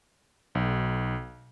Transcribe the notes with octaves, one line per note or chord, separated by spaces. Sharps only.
B1